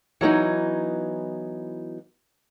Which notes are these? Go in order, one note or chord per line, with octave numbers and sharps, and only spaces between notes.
E3 F#3 B3 D#4